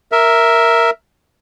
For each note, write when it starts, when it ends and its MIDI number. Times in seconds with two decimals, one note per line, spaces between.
0.12 0.90 70
0.12 0.90 76